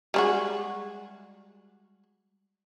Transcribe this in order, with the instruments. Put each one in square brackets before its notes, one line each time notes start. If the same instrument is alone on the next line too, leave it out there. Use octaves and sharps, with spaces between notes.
[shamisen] G3 G#3 F#4